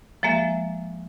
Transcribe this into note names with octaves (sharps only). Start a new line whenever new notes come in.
F3 G#3 A#3 E5